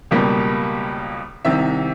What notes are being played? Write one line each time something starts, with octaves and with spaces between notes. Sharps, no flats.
C#2 B2 G3 A#3
C2 C3 D#3 E5